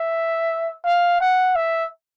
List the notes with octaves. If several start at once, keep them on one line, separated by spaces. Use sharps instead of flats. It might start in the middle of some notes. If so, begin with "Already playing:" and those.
Already playing: E5
F5
F#5
E5